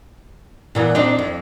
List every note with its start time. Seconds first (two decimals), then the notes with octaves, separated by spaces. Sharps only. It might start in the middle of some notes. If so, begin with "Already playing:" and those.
0.75 A#2 E3 B3
0.95 C4 D4 D#4
1.19 F2